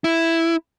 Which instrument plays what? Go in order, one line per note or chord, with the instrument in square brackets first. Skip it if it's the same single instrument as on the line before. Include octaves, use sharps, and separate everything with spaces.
[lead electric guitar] E4